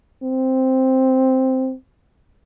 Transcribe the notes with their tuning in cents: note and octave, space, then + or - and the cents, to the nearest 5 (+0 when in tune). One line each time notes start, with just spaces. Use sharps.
C4 +0